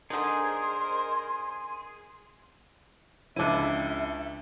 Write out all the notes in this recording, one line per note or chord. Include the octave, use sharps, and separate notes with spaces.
D3 D#4 G#4 A#4 C5 D#5 C6
C#2 D4 E4 E5 D#7